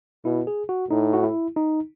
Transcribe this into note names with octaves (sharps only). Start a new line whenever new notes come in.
B2 E4
G#4
F#4
A2 D#4
F#4
E4
D#4